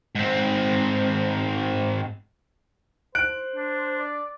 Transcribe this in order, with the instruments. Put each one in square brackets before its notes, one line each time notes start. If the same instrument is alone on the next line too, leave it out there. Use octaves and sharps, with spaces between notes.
[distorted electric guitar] G#2 C4
[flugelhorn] C5 [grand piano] F#6 D7
[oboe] D4
[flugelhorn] D5